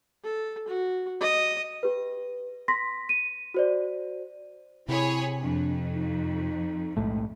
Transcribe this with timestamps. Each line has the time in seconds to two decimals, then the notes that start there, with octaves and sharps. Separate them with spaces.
0.24 A4
0.68 F#4
1.21 D#5
1.83 G4 B4
2.68 C6 A#6 B6
3.09 D#7
3.54 F#4 C5 D5
4.88 C3 E4 G#4 C#5 B5
5.41 F2 D4
5.90 D#4
6.97 B1 A2 G#3 A3